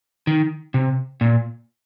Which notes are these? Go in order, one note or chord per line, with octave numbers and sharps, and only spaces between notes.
D#3
C3
A#2